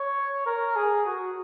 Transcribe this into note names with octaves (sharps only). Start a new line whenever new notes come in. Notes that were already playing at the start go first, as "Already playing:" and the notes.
Already playing: C#5
A#4
G#4
F#4